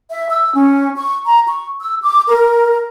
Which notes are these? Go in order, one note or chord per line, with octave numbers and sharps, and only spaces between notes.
E5
E6
C#4
C#6
A#5
C#6
E6
D6
A#4